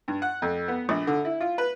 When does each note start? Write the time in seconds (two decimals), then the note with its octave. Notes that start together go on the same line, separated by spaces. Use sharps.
0.08 G2
0.22 F#5
0.42 F2
0.68 B3
0.89 A#1
1.07 D3
1.25 E4
1.40 F4
1.58 B4